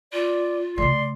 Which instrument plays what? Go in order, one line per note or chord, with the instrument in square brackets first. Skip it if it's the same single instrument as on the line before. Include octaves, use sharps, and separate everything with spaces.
[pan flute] F4 [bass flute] D5
[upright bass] C#3 A3 [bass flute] D5 [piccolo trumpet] C6